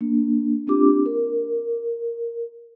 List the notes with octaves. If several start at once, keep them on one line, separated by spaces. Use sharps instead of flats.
A#3 D4
A#3 C4 D4 F4 G4 D6
A#4